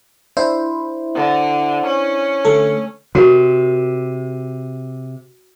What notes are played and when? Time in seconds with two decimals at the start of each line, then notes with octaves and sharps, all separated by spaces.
0.37 D4 E4 C5
1.15 D3
1.86 C#4
2.45 D3 A3 A4
3.15 C3 F#4 A#4